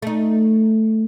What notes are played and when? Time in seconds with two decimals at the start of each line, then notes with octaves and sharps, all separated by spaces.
0.02 A3 D#4